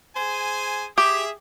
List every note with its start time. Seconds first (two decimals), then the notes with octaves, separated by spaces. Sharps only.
0.17 G#4 C5 G#5
0.98 G4 G#4 E5